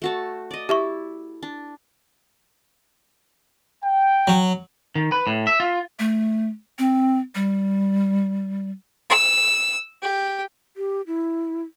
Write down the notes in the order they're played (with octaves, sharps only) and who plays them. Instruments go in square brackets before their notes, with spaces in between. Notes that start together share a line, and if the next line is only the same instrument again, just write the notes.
[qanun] A3 F#4 A5
D5 D#5
[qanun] E4 [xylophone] G4 E5 C#6
[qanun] D4
[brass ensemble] G5
[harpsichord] F#3
[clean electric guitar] D#3
B4
A2
E5
F4
[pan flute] A3
C4
G3
[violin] E6
G4
[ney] G4
E4